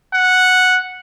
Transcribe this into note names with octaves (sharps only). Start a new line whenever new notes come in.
F#5